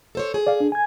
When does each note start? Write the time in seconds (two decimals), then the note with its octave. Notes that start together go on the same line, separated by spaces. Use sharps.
0.15 A4 C5 C#5
0.34 G#4
0.47 D5 F5
0.60 D4
0.72 G#5 G#6